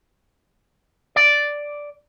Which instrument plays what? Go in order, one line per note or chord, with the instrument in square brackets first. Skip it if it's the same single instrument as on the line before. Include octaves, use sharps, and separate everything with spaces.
[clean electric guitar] D5